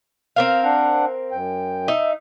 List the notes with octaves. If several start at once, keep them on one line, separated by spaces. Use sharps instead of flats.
C4 A#4 F5
D4 F#5
F#2 G5
D#4 E5